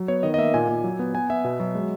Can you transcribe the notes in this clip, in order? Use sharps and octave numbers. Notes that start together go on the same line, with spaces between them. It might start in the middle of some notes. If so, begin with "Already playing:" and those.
Already playing: F#3
B3 C#5
D#3 D#5
D#5
A#3 E5
A#2 G#5
A#2
F#3
B3
B3 G#5
B3 E5
B2
F#3
G#3